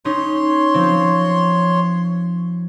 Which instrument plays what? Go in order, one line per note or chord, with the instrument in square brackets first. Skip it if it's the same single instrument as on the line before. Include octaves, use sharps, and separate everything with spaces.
[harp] C#4 D#4 [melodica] C#5 C6
[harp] F3 C4